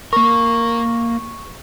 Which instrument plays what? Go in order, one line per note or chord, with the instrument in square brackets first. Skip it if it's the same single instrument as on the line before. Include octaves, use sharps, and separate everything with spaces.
[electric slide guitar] A#3 A#4 [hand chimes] C#6